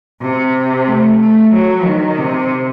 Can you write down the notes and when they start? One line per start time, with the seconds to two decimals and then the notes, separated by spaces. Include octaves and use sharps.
0.22 C3
0.88 A3
1.20 A3
1.53 F#3
1.85 D#3
2.18 C3